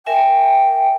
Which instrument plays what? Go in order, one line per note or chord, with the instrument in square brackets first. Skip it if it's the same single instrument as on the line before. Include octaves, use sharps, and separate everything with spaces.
[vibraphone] A#4 E5 G#5 [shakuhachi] G5